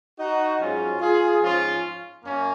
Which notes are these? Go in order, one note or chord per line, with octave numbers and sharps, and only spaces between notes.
D#4 F#4
G#2 F#3 C#4 F4
F4 G#4
G#2 F3 C#4 F4
F#2 A#3 C#4